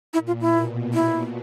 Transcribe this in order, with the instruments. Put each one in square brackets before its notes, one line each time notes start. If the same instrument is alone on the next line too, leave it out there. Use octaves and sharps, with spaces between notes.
[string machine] A#2 [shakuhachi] E4
[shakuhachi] F4
E4
[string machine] B2
[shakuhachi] E4